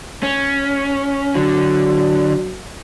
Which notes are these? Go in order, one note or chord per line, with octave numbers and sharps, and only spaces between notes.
C#4
D3 F#3